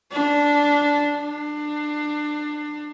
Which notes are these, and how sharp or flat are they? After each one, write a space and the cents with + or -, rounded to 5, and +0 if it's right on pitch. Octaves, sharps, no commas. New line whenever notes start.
D4 -10
D4 +25